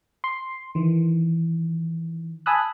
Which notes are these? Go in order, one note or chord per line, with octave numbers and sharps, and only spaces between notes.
C6
D#3 E3
G#5 A5 B5 D#6 E6 F#6